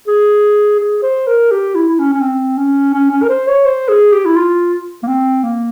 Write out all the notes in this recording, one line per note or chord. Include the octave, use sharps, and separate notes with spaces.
G#4
G#4
C5
A#4
G4
E4
E4
C#4
C#4
C4
C#4
C#4
C#4
A#4
C5
C#5
C5
G#4
G4
E4
F4
A#3
C4
A#3